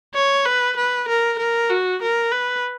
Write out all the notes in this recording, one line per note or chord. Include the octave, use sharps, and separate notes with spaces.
C#5
B4
B4
A#4
A#4
F#4
A#4
B4